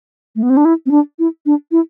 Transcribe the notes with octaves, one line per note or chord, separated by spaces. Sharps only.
A3
B3
C4
D4
E4
C4
D4
E4
D4
E4